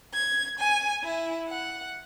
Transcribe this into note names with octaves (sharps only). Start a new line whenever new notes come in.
G#6
G#5
E4
F#5